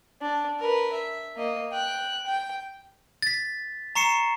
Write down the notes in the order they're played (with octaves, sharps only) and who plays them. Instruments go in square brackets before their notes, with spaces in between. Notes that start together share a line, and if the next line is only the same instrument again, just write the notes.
[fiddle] D4
A#4 B4
E5
A#3 D#5
G5 F#6
G5
[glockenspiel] A6 B6
A#5 C#6 C7 C#7 E7